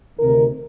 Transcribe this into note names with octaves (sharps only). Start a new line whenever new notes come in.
D2 C3 D#3 A#4